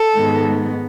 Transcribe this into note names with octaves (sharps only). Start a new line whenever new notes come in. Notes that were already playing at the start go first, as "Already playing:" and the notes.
Already playing: A4
G#2 D#3 G#3 B3